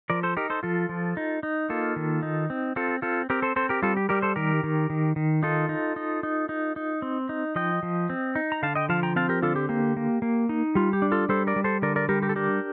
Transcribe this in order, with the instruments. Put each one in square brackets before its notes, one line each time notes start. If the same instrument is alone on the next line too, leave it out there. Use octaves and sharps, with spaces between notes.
[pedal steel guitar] F3 A#4 D5
A4 C5
D#4 G4 A#4
A4 C5
F3 F4 A4
F3
D#4
D#4
A#3 F4 A4
D#3
D#4
C4
C4 F4 A4
C4 F4 A4
C4 G4 A#4
A4 C5
C4 A4 C5
G4 A#4
G3 F4 A4
G4
G3 G4 A#4
A4 C5
D#3 G4 A#4
D#3
D#3
D#3
D#4 F4 A4
D#4
D#4
D#4
D#4
D#4
C4
D#4
F3 D#5 G5
F3
C4
D#4
A#5
D3 F5 A5
D#5 G5
F3 F5 A5
G5 A#5
C4 F5 A5
G4 A#4
D3 F4 A4
G4
A#3 G4
A#3
A#3
D#4
G3 F4
G4
D4
F4 A4
G3 A4 C5
A#4 D5
G3
A4 C5
D3 A#4 D5
A#4 D5
G3 G4 A#4
G4 A#4
A4
D4 G4 A#4